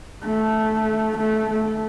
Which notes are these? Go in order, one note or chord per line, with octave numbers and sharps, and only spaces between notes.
A3
A3
A3